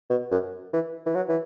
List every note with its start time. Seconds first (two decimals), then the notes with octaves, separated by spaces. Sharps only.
0.10 B2
0.32 F#2
0.73 E3
1.06 E3
1.15 F#3
1.29 E3